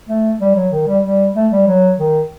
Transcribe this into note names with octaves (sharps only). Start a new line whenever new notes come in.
A3
G3
F#3
D#3
G3
G3
A3
G3
F#3
D#3